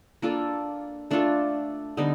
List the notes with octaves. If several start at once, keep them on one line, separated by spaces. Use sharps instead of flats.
A#3 D4 F4 A4
A3 D4 F4 A4
D3 G3 B3 D#4